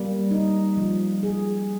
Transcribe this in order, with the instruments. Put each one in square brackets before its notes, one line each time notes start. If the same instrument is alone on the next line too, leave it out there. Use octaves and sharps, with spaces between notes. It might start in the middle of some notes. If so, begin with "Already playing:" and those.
Already playing: [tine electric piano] G3 [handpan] A#3
[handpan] D#4
F3
G#4